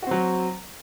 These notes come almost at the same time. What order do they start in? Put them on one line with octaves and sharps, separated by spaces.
F#4 C4 F#3